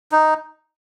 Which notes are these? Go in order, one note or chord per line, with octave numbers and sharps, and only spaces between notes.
D#4